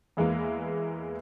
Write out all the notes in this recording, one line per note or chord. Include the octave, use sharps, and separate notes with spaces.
E2 E3 G#3 A#3